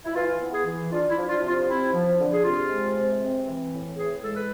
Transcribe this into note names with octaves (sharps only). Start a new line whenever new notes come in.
E4
E3 F4
B3
G#4
E3
D4 F4
E4
F3
F4
C3
F4
C4 E4
F3
D3
G#4
C3 F4
G#3
C3
C4
E3
A2
E3 G#4
G#3 A4
B4